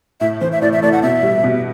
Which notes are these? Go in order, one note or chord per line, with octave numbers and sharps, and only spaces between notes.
A2 E5
E3 C5
E5
A2 D5
E5
A3 D5
F#5
B2 E5
G3
B2